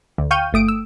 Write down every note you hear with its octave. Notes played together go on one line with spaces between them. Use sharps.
D2
F5 G5 C#6 F6 G6 D#7
G1 A3 D#6 D7
E6